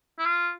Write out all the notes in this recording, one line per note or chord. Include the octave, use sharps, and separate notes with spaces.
E4
F4